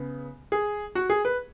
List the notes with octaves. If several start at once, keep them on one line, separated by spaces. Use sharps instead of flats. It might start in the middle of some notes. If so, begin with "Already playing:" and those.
Already playing: C#3 B3
G#4
F#4
G#4
B4